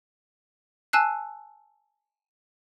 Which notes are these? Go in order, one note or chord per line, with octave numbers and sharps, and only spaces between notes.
G#5 A5 E6 F#6 C7